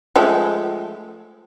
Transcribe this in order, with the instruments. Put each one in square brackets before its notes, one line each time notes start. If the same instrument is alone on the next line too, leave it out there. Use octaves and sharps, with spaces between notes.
[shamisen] F3 G#3 A3